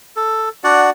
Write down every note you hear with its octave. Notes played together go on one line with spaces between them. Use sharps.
A4
D4 F#4 D5 F#5